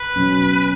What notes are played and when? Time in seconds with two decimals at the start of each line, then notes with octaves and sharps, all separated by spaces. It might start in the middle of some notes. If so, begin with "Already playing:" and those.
Already playing: B4
0.16 B2 F#3 C#4